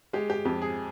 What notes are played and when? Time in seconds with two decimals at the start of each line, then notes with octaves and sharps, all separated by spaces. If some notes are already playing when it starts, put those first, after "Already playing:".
0.13 G#3 G4
0.30 G4
0.45 F2 G4
0.62 G#4